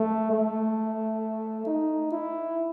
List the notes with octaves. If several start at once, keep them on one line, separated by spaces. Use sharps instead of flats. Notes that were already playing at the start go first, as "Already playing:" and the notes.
Already playing: A3
A3
D#4
E4